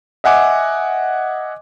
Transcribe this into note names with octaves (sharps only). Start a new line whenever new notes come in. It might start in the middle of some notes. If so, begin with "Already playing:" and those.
D#5 E5 F#5 G#5 D6